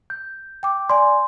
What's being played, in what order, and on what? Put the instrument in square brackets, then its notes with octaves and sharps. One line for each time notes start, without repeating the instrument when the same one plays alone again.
[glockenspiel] G6
[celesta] G5 D6
[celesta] D5 G#5 [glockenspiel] C6